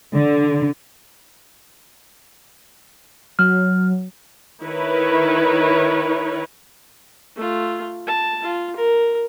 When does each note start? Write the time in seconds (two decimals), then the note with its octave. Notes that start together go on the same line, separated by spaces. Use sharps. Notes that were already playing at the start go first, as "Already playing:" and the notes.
0.14 D3
3.39 F#3 F6
4.63 D#3 E4 A#4 B4 C#5
7.36 A3 F4
8.07 A5
8.43 F4
8.76 A#4